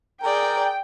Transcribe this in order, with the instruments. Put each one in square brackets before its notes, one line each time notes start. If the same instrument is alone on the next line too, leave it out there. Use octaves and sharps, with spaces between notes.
[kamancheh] G#4 D5 [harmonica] A#4 [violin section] G5